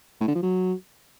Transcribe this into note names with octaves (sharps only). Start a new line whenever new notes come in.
A2
D3
F3
F#3